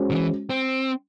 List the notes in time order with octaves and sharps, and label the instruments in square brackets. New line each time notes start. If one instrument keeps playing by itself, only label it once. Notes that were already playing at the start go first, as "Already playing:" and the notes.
Already playing: [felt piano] G#3 C#4 F#4 C5
[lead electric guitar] D#3
E3
C4